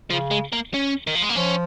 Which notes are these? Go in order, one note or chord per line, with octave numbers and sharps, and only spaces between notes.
C#3 F3
G#3
A#3
C#4
D#3
F3
G#3
A#3
F3 C#4